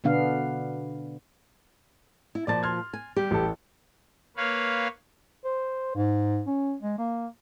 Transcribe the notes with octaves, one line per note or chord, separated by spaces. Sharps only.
B2 D3 B3 D4 F5
E4
A#2 F3 D5 A5 A6
C6 F6 G#6
G#5
G3 G4
A1 A4
A#3 B4 C#5 F5
C5
G#2
C#4
G#3
A#3